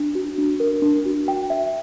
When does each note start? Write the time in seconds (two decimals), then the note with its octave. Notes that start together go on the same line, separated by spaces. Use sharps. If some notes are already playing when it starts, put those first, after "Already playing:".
Already playing: D4
0.15 F#4
0.38 D4
0.60 A#4
0.82 D4
1.05 F#4
1.28 G5
1.50 E5